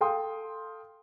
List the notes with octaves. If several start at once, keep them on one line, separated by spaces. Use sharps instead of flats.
A4 F5 G5 C6 D#6